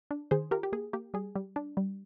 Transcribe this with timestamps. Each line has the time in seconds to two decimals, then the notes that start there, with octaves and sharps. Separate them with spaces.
0.11 D4
0.31 D#3 G#4 C5
0.51 F4 G4 A#4
0.63 G4
0.73 A#3 G#4
0.93 A#3 G4
1.14 G3 G#4
1.36 G3
1.56 D4
1.77 G3